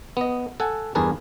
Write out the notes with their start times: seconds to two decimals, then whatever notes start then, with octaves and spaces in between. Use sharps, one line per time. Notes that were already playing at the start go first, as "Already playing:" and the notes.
0.17 B3 D#5
0.60 A4 F#5 G#5
0.95 E2 G2 G#4 A#4 B4 A5